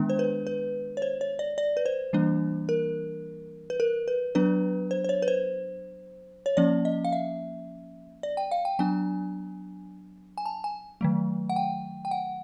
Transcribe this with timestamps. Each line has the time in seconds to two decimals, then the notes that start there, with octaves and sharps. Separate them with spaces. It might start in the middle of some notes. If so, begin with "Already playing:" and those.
Already playing: D#3 G#3 B3 D4
0.10 C5
0.19 B4
0.47 B4
0.97 C#5
1.02 C5
1.21 C#5
1.39 D5
1.58 D5
1.77 B4
1.86 C5
2.13 E3 G3 A#3 D4
2.69 A#4
3.70 B4
3.80 A#4
4.08 B4
4.35 F#3 B3 D4 B4
4.91 C5
5.04 C5
5.09 C#5
5.22 B4
5.28 C5
6.46 C#5
6.57 F3 A#3 C#4 D5
6.85 D#5
7.05 F5
7.12 E5
8.23 D5
8.37 G5
8.51 F5
8.65 G5
8.79 F#3 B3 D4 G#5
10.38 G#5
10.46 A5
10.64 G#5
11.01 D#3 F#3 A3
11.50 F#5
11.56 G5
12.05 G5
12.11 F#5